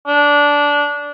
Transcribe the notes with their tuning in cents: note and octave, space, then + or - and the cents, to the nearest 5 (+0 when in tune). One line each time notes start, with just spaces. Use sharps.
D4 -15